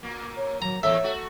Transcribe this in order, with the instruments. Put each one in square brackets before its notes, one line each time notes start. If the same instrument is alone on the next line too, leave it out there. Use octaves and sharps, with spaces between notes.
[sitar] A#2 A#3
[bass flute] C#5
[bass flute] F#3 [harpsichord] A#5
[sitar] E2 A#2 A4 [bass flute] C#5 [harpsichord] E5
[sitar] A3 F#4